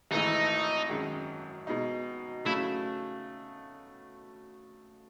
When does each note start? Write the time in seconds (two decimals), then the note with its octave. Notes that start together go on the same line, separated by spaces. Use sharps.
0.11 G#1 G#2 E3 A3 D#4 E4
0.89 F#2 D#3 G#3
1.67 B2 G#3 D#4
2.45 C#3 F#3 A3 E4